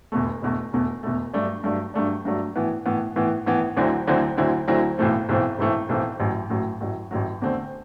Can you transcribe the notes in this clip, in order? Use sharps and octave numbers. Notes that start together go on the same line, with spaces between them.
E1 E2 B2 A3
E1 E2 B2 A3
E1 E2 B2 A3
E1 E2 B2 A3
G2 F#3 A3 D4
G2 F#3 A3 D4
G2 F#3 A3 D4
G2 F#3 A3 D4
A2 E3 B3
A2 E3 B3
A2 E3 B3
A2 E3 B3
D2 D3 F#3 C4 E4
D2 D3 F#3 C4 E4
D2 D3 F#3 C4 E4
D2 D3 F#3 C4 E4
B1 A2 E3 A3 C4
B1 A2 E3 A3 C4
B1 A2 E3 A3 C4
B1 A2 E3 A3 C4
A1 A2 F#3
A1 A2 F#3
A1 A2 F#3
A1 A2 F#3
E2 D3 A3 C4